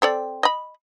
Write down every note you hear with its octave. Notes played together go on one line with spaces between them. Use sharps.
C4 A4 D5
D#5 B5